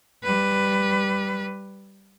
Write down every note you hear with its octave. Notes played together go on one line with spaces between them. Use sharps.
G3 B4